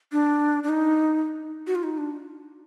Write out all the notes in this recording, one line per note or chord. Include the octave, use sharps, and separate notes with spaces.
D4
D4
D#4
F#4
F4
D#4
D4